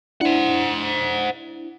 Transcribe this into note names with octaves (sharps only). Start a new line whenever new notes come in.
D4 E4 C5 F#5